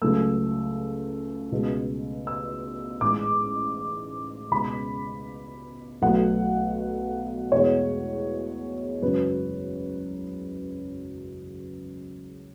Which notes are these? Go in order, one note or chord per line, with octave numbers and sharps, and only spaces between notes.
C#2 C#3 F#3 A3 E6
C#2 B2 G#3
E6
A1 G#2 G#3 D6
C#2 B2 G#3 B5
B1 B2 F#3 A3 F#5
E2 B2 G#3 C#5
G#1 F#2 C#3 F#3 B4